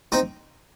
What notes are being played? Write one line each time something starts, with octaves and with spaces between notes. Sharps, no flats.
C4 D#4 C5